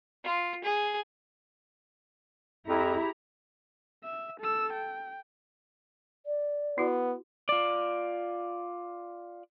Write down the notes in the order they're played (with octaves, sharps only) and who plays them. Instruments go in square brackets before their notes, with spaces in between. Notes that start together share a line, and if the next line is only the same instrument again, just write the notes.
[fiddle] F4
G#4
[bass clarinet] F2 [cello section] E4 [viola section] G4 G#4 A#5
[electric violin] E5
A4 E6
G5
[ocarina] D5
[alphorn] B3 [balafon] E4 F#4
[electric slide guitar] F4 D5